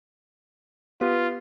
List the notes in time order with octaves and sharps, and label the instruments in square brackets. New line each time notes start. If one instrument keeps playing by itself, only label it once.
[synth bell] B3 G4 B4 [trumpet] F4